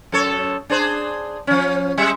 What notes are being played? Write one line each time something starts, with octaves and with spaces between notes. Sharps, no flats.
F#2 A4 C#5
D4 G#4 C5
F3 C#4
G3 G#3 E5